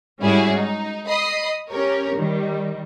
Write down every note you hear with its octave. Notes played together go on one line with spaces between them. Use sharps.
G#2 G3 C#4 E4 F#4 G#4
D#4
D#5 B5 D#6 C7
C#4 G4 A#4 C#5
D#3 G3